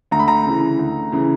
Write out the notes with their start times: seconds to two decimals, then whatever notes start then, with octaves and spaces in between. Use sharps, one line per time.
0.11 D2 A#5
0.19 B5
0.28 A#5
0.45 C#3 E3
0.79 D2
1.12 C#3 E3